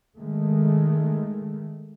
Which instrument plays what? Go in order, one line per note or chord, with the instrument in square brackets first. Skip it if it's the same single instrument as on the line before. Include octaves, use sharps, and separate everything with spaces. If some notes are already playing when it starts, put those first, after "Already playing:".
[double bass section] D#3 G#3 A3